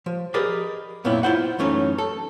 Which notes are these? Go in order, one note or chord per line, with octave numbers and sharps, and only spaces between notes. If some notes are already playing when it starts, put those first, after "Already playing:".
F3
G4 G#4 A#4 B4 D5 D#5
F#2 A#2 B3 C4 E4
E4 F4 C5 F#5
F#2 E3 A3 C#4 D#4
A4